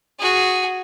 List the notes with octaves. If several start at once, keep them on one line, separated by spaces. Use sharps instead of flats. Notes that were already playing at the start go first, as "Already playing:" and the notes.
F#4 G#4